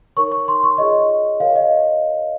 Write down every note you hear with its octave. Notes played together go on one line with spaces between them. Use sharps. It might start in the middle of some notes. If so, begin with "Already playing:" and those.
D#4 A#4 C#5 C#6
C#6
C6
C#6
F4 G#4 C#5 D#5
F4 A#4 C#5 F5
D#5